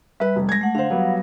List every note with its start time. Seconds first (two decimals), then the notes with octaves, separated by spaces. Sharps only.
0.20 G3 B4 E5
0.36 F1
0.49 G#3 G#6 A#6
0.61 A3 F#5
0.75 D3 C5 F5 F#5
0.90 F#3 G3 B3